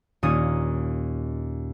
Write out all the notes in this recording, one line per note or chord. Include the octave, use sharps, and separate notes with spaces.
D#2 A#2 D#3 C#4 D#6 D#7